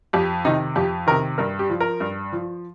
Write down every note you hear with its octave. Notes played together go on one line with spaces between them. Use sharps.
F2 G4
C3 D#3 D#4
F2 G4
C3 D#3 A#4
G2 A#4
G4
F3
A#4
G2
F3